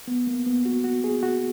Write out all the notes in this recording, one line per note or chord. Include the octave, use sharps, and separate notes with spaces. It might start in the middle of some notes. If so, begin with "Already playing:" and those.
B3
A#3
B3
F#4
F#4
G#4
F#4